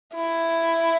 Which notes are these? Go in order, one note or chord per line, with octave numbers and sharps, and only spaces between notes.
E4